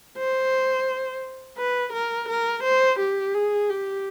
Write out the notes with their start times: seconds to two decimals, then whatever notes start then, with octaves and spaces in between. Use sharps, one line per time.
0.17 C5
1.57 B4
1.93 A#4
2.28 A#4
2.64 C5
2.99 G4
3.34 G#4
3.69 G4